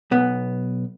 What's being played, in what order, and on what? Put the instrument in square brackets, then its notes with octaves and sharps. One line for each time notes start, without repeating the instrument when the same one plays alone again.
[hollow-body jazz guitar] B1 B3